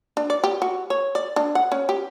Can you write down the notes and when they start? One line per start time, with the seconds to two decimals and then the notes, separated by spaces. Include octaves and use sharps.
0.17 D4
0.30 D5
0.44 G4
0.62 F#4
0.90 C#5
1.15 D5
1.36 D4
1.55 F#5
1.72 C#4
1.89 G4